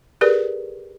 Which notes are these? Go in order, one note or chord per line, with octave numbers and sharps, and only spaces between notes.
G4 G#4 A#4 B4 D5